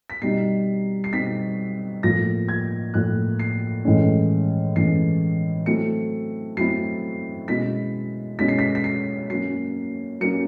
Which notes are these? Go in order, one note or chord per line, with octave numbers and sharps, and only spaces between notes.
B6
B2 G3 C4 D#4 C7
C7
B2 G3 C4 D#4 B6
A2 F3 A#3 A#6
G#6
A2 F3 A#3 F#6
C7
A2 E3 G#3 C#4
A2 E3 G#3 C#4 C7
F#3 A3 C4 E4 C#7
F#3 A3 C4 E4 C7
B2 G#3 C#4 E4 B6
B2 G#3 C#4 E4 B6
C7
B6
B6
C7
F#3 A#3 C#4 C7
F#3 A#3 C#4 C#7